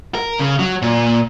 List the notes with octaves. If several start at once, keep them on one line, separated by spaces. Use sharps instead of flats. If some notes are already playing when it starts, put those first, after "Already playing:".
A#4
C#3
F#3
A#2